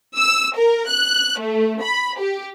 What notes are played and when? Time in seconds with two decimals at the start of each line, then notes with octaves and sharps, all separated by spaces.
0.18 E6
0.58 A#4
0.90 F#6
1.41 A3
1.83 B5
2.20 G4